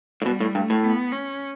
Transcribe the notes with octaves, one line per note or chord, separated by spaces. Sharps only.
A2
B2 G3
A2
G2 A3
A2
B3
C#4